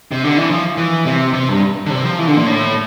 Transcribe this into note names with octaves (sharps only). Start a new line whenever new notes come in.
C3
D3
E3
F3
E3
C3
C3
G2
D3
C3
F3
E3
D3
A#2
A2